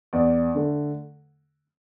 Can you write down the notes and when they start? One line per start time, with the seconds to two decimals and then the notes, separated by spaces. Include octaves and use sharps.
0.13 E2 D5
0.55 D3 A3